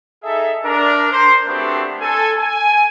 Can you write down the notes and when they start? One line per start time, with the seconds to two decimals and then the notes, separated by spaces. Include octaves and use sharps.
0.23 D#4 G#4 A4 E5
0.64 D4 A#4
1.10 C5
1.47 A3 B3 C4 D4 F#4 G4
2.01 A4 G#5
2.38 G#5